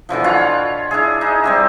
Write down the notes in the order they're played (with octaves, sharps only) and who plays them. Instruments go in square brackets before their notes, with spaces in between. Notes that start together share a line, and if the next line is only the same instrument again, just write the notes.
[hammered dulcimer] B2 D3 E3 F3
F4 C#5 F5 F#5
D4 E4 G#4
D#4 E4
G3 C4 G4